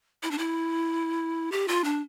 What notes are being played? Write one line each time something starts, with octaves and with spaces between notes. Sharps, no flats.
E4
D4
E4
G4
F4
D4